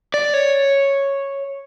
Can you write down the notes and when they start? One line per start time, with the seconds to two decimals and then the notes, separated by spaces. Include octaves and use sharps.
0.14 D5
0.34 C#5